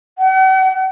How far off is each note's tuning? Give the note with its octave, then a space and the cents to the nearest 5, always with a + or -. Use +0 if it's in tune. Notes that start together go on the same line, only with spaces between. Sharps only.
F#5 +45